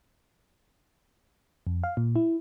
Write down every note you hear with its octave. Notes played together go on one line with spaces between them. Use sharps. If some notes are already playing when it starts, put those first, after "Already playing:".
F2
F5
A#2
E4